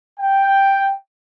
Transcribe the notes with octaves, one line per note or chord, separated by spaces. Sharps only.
G5